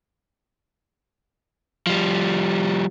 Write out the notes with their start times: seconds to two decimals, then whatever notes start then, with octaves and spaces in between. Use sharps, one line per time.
1.87 F3 G3